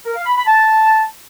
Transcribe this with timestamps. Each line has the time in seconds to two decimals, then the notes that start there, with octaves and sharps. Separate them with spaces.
0.06 A#4
0.16 F5
0.26 B5
0.36 B5
0.46 A5